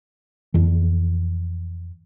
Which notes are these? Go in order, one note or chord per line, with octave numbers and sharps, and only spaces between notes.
F2 E3